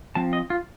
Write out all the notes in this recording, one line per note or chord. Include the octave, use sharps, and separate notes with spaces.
F3 C4 A5
D#5
F4